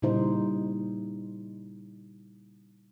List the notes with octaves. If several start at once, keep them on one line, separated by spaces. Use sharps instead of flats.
A#2 C#3 G3 D#4 E4 C5